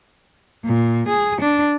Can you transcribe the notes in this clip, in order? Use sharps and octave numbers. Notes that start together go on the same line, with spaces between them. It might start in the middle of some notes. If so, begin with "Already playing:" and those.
A#2
G#4
D4